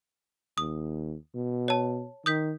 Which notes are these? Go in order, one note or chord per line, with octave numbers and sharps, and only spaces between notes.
D#2 D#6
B2
C#5 A5
D#3 D#6 G6 B6